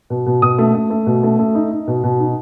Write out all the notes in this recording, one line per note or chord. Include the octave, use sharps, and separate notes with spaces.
B2
B2
B2 D#6
A3
A3
A3
B2
A3
A3
D#4
D#4
B2
B2
D#4